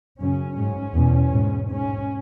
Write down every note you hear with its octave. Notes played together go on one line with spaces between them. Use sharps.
F#2 C#3 C#4
G#2 C#4
E2 B2
G#2
G#2 C#4